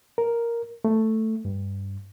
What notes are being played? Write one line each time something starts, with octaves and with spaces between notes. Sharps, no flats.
A#4
A3
G2